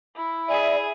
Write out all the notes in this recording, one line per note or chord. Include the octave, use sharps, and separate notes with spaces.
E4
G#4 D5 E5